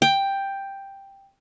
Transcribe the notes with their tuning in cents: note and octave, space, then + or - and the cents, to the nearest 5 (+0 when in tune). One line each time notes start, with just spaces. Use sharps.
G5 +5